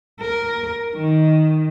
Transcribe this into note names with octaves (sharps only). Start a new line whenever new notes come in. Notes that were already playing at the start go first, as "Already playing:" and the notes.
A#4
D#3